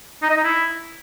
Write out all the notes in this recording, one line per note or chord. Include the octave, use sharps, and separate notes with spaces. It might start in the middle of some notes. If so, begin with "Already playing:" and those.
D#4
D#5
D#4
E4